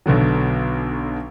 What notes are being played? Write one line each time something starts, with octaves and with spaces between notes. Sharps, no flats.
B1 B2 D3 F#3